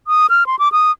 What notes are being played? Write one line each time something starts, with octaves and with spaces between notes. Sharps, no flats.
D#6
F6
C6
D6
D#6